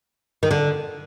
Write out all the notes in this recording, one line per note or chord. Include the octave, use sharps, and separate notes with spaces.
D#3
D3